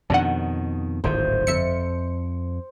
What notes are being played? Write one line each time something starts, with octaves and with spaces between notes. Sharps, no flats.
F2 B2 D#3 D4 F#5
D1 G#1 D#3 C5
G1 F2 E5 C#7